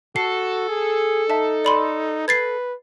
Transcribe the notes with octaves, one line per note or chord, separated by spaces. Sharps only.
F#4 A4 C7
G#4
D#4 E5 A5
D5 B5 C6
B4 G#6 A6 C7